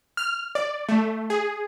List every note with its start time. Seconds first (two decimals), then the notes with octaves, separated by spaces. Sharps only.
0.17 F6
0.55 D5
0.89 A3
1.30 G#4